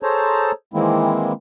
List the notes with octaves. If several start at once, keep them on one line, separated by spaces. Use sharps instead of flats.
G#4 A4 C5 C#5 A5 A#5
D#3 E3 G#3 A#3 C4 E4